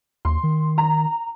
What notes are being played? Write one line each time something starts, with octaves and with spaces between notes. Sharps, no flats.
D#2 C6
D#3
A#5